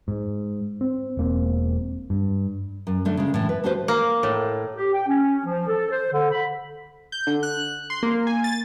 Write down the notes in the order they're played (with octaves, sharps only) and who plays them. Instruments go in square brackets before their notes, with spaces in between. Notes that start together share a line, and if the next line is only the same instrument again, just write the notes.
[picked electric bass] G#2
C4
E1 A#3 C4
G2
[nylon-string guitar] F#2
D3 A3 D4
C#3 G#3
A2 E3
B4
A3 F#4 G4 B4 C5
[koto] A#3
A2
[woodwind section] G4
G5
C#4
F3
A4
C5
D3
B5
[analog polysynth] G6
D3
F#6
C6
A#3
G#5
A6